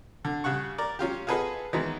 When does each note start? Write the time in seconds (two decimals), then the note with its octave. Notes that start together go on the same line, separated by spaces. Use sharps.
0.25 D3
0.44 C#3 G3 F#5 C#6
0.78 A#4 D5
0.99 F#3 C#4 F4 G4
1.27 F4 F#4 G#4 A4 B4 D#5
1.73 D#3 E3 F#3 G#3 B3